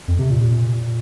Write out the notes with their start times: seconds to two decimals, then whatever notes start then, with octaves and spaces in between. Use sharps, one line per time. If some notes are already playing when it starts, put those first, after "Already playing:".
0.08 F2
0.19 C3
0.30 A#2